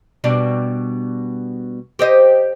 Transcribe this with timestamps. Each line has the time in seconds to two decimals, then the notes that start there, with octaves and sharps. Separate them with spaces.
0.24 B2 G3 D4
1.99 G4 C5 D#5